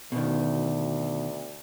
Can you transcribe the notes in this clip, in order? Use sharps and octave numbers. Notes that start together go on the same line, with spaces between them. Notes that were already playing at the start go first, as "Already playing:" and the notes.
D2 B2 D#3